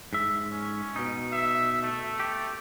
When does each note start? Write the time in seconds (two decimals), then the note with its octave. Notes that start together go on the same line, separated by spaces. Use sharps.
0.13 G#2 E5
0.51 C#4
0.96 B2 D#4
1.32 E5
1.82 A3
2.20 G4